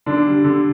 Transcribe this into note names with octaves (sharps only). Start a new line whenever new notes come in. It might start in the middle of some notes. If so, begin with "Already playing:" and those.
D3 D4
G3
D3